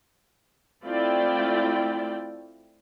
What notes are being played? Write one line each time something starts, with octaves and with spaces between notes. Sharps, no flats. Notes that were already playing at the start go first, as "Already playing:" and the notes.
A3 C4 E4 F4 D5 G5